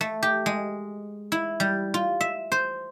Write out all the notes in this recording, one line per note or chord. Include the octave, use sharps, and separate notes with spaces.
A3
G4
G#3
E4
G3
F4
E5
C5